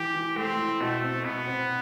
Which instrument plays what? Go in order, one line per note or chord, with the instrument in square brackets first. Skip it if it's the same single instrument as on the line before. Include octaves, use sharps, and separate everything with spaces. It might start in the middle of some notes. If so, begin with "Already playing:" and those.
Already playing: [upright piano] E3 [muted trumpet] G4
[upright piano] E3
[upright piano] A3 [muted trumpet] C4
[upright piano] E4
[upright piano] B2 [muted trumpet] A3
[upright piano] C4
[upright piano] B2 [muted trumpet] B3
[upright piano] C4